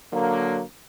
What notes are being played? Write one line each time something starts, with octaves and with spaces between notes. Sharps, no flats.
D3 F#3 A#3